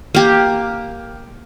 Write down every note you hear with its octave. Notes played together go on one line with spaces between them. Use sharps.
A#3 G4